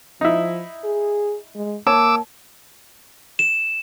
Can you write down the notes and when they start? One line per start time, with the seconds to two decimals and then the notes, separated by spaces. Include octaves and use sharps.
0.21 F3 D#4 E4
0.84 G#4
1.55 G#3
1.87 A#3 C#5 A5 D6 E6
3.39 E7